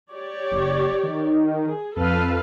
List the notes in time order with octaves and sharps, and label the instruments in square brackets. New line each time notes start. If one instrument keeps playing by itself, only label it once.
[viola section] G4 C#5 D5
[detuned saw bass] F#1
D#3
[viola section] G#4
[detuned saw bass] F2 [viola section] A4 B4 F5